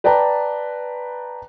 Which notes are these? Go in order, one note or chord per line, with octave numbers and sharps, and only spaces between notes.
B4 D5 G5 A5 A#5